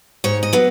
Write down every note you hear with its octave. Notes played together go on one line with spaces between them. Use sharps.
G#2 C#5
D#5
F#3 B3